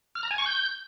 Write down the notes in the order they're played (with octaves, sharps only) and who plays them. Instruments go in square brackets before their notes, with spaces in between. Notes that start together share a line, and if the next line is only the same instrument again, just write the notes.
[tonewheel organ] F6
A#5
G#5
C#6
G6